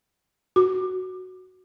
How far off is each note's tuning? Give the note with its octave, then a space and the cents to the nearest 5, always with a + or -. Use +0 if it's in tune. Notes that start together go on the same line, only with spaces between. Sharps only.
F#4 +0 D6 +25